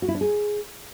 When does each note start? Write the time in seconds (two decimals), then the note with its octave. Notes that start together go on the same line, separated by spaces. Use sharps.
0.02 F#4
0.08 E4
0.15 D4
0.21 G#4